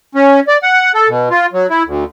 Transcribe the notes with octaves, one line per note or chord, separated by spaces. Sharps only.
C#4
D5
F#5
A4
B2
F4
F#3
E4
D2